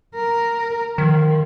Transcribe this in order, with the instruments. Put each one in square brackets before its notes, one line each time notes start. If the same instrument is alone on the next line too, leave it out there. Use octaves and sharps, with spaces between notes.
[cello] A#4
[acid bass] D#3 [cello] F3